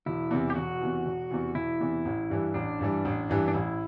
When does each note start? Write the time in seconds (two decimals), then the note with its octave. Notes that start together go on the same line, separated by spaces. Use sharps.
0.06 E1 E4
0.31 E2 C3 E3
0.50 G4
0.55 E1 F#4
0.80 E2 C3 E3
1.06 E1
1.30 E2 C3 E3
1.55 E1 E4
1.80 E2 C3 E3
2.05 A1
2.30 G2 E3 G3
2.54 A1 D4
2.80 G2 E3 G3
3.05 A1
3.30 G2 E3 G3
3.48 D4
3.54 A1 E4